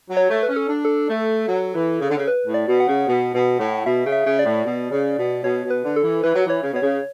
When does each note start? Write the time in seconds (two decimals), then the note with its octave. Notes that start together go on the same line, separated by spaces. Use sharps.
0.10 F#3
0.17 C#5
0.29 A3
0.43 B4
0.49 C#4
0.56 A4
0.69 D4
0.85 A4
1.09 A3
1.48 F#3
1.75 E3
2.01 C#3
2.10 D3
2.17 C#3
2.28 B4
2.47 A2
2.54 D5
2.68 B2
2.80 F#5
2.87 C#3
3.07 B2
3.34 B2
3.60 A2
3.86 B2 E5
4.05 C#3
4.12 E5
4.25 C#3
4.39 D5
4.45 A2
4.65 B2
4.91 C#3
5.18 B2
5.44 B2 C#5
5.64 B2
5.70 B4
5.84 D3
5.96 A4
6.03 E3
6.24 E3 B4
6.35 F#3
6.47 E3 C#5
6.63 C#3
6.72 B2 C#5
6.82 C#3